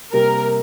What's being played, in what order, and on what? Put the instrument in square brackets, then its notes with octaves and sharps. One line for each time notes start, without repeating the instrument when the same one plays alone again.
[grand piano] C3 G3 A#3 [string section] A#4